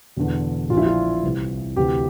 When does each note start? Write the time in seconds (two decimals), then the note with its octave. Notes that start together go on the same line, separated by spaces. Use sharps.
0.16 E1 E2 D3
0.70 A#2 F4
0.74 A#1 E4
0.86 F4
1.23 C2 C3 E3
1.76 D2 C3 E3 G4